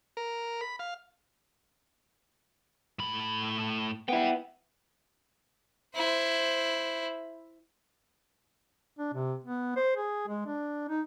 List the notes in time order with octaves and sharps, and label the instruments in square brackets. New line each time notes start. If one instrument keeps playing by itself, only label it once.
[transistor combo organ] A#4
B5
F5
[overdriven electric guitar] A2 B5
[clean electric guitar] B3 E4 [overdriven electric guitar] D5 G5
[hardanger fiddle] E4 C5
[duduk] D4
C3
B3
C5
G#4
G#3
D4
D#4